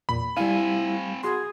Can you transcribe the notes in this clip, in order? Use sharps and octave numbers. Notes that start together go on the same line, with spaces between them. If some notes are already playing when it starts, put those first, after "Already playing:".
E2 A#2 B5
G3 C4 E4 F5 G#5
F#4 G#4 C6